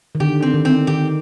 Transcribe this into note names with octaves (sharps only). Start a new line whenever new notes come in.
D#3
D3 G4
C4
D#3
C4
D#3 G4